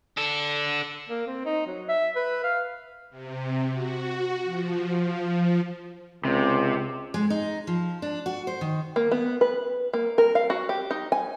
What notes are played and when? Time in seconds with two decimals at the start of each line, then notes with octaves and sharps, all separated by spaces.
0.17 D4 A4
1.09 A#3
1.27 C4
1.46 D#4
1.66 F#3
1.89 E5
2.16 B4
2.44 F5
3.10 C3
3.71 F#4
4.44 F3
4.94 F3
6.25 C#2 C3
7.14 G#3
7.30 D#4
7.67 F3
8.02 D4
8.26 F#4
8.47 C5
8.61 D#3
8.96 A#3
9.11 B3
9.41 B4
9.93 A#3
10.18 A#4
10.35 F5
10.50 F#4
10.69 G4
10.91 D#4
11.12 G#5